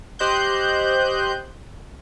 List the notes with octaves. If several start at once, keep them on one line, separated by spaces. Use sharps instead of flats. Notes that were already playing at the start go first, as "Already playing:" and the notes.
G4 C5 D#5 C6 F#6 G6